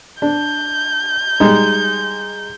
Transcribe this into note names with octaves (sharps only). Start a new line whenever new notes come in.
D4 G6
G3 G#3 D#4